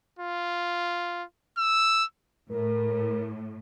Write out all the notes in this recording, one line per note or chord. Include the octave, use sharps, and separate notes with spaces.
F4
E6
A2 A#4